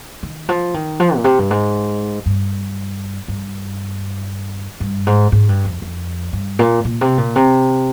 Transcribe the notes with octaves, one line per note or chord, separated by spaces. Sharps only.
D#3
F3
D#3
F3
A#2
C3
G2
G#2
G2
G2
G2
G#2
G#2
G2
F2
F2
G2
A#2
A#2
C3
A#2
C3